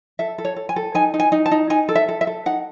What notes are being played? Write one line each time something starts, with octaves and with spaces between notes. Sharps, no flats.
A4 E5
A4
C#5
A4
G#5
A4
D#4 G#5
D#4
G#5
D#4
A5
D#4
D#4 G#5
A4
E5
A4
E5
A4
D#4 F#5